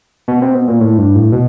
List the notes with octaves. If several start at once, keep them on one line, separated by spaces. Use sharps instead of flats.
B2
C3
B2
A#2
A2
G2
A2
B2